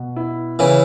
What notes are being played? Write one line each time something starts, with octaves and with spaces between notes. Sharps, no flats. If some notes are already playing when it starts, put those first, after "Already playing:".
Already playing: B2
E4
C#3 E3 E4